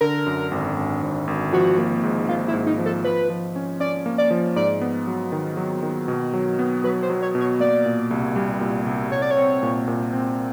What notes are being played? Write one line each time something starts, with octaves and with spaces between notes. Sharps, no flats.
D3 A#4
F#2
G#1
G#1
G#1
G#1
F3 F#4
A#3
G#2
A#3 F4
E4
G#2
D#4
F3
A4
F3 B4
F3
C#4
C#4 D5
A#3
D5
F3
G#2 D5
B3
F#3
D#3
F#3
D#3
B2
F#3
B3
F#3 B4
C5
F#3
C#5
B2
C#5
A#3 D5
A#2
C2
G3
A#2
C2
C2 C#5
D5
C#5
C4
A#2
A#2
C4